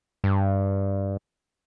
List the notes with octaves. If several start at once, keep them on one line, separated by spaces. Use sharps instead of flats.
G2